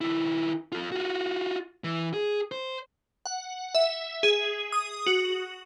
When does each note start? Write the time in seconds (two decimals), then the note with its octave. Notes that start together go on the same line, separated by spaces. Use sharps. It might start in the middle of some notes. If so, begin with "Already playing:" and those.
0.01 D#3 E4
0.72 F4 A4
0.92 F4 F#4
1.84 E3
2.14 G#4
2.52 C5
3.26 F#5
3.75 E5
4.23 G#4
4.72 D#6
5.06 F#4